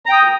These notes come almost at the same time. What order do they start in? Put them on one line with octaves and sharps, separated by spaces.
A#5 G5 D#6